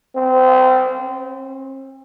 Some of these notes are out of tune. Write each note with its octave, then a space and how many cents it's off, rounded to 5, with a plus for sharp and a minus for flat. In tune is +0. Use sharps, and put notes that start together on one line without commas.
C4 -25
C4 +40